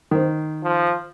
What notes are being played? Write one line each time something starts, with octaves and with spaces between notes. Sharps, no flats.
D#3 C5
F3